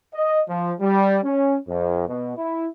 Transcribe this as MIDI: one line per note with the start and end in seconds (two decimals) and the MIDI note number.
0.14 0.41 75
0.49 0.72 53
0.80 1.19 55
1.24 1.57 61
1.68 2.05 41
2.08 2.36 47
2.37 2.67 64